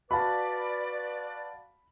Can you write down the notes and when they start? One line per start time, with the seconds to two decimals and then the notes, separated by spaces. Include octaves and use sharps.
0.11 F#4 B4 D5 F5 A5 B5